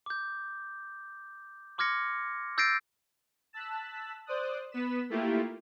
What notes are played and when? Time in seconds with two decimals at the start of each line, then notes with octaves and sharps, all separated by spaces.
0.06 D6 G6
1.78 C6 D6 F6 G#6 A#6 C#7
2.58 E6 G6 A6 A#6 C7 D7
3.53 A5 E6 F#6 B6
4.26 C5 D5 D#6 F#6
4.71 B3 B4 B6 E7
5.10 A3 A#3 E4 F4 G4